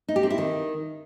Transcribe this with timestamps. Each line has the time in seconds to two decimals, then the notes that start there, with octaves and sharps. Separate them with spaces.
0.08 D#4
0.16 G4
0.23 C4
0.30 E4
0.38 D#3